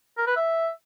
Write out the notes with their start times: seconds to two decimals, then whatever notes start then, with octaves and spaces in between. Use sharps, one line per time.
0.18 A#4
0.27 B4
0.36 E5